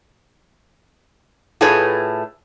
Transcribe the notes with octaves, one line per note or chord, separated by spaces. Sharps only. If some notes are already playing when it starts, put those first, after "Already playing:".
A2 A3 F4 G#4 B4 C#5